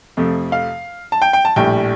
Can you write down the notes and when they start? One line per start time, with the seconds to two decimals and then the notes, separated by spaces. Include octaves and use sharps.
0.17 F2 C3 F3 A3
0.52 F5
1.12 A5
1.22 G5
1.33 G5
1.45 A5
1.56 A#1 A2 G3 G5